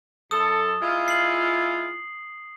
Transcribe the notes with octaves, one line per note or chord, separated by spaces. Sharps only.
F#2 A4 D#6
G#3 E4 F4
C7 F#7